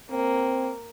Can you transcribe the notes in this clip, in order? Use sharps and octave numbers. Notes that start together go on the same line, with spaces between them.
A#3 C4